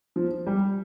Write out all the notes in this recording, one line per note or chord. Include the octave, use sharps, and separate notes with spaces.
F3
G3